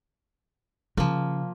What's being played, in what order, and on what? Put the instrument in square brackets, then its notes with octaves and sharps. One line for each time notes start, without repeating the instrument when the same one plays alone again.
[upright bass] C#3 [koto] F3 A#3